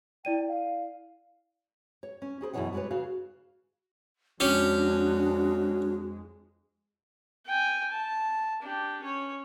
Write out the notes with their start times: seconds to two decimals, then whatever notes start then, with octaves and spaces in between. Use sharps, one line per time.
0.25 E4 D5 G5 D#7
0.48 F5
2.03 C#5
2.22 C#4
2.41 C#4 G#4 A#4 C5
2.54 F#2 B2 D#3 E3 C#5 F#5
2.73 G3 G#3 G#4 B4 C#5
2.91 C#3 F#4 G#4 F5
4.40 F2 G#3 C#4 D4 F#4 G4
7.46 G5 G#5
7.91 A5
8.62 D4 G4
9.01 C#4 C#5